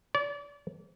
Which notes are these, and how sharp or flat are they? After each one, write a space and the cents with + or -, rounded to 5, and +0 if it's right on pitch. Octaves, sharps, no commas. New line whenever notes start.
D5 -35